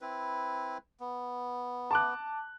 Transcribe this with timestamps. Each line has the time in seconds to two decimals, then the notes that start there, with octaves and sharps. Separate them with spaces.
0.01 C4 E4 B4
1.00 B3
1.91 A5 D6 F#6